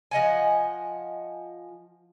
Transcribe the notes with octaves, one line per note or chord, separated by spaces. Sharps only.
F3 D#5 F#5 G#5